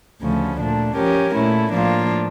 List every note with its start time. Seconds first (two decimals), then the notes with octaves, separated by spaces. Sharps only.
0.22 D2 C#3 F3 A3 C#4
0.60 A#2 A3 D4
0.96 F3 C#4 G4 A#4
1.35 A#2 A3 C#4 E4
1.72 A2 F3 A#3 D4 F4